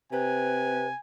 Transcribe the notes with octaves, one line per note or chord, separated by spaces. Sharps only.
C3 B4 G#5